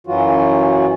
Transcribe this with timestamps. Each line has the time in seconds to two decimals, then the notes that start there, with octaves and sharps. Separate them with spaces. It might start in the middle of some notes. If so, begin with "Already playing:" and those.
0.07 F#2 E3 F#3 F4 F#4